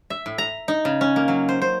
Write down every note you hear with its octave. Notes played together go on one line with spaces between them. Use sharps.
E5
A2
A#5
D#4
C#3
C#4
A#3
F#3
C5
C5